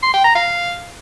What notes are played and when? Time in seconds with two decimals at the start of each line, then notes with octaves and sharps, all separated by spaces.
0.02 C6
0.13 G5
0.24 A#5
0.35 F5